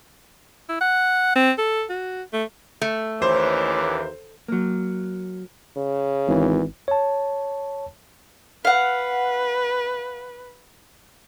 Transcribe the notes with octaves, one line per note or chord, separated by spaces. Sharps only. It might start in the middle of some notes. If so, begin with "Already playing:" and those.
E4
F#5
C4
A4
F#4
A3
A3
D#2 E3 C#4 C5 D6
F#3 A#3
C#3
G#1 E3
C#5 A5
B4 F5 F#5